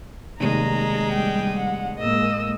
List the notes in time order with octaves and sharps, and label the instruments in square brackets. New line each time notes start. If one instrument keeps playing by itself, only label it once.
[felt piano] F1 D#2 [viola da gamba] G#3 [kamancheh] A#5
[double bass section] G3 [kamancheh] G5
[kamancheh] F#5
[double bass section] A2 G#3 A#3 [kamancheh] D#5 E6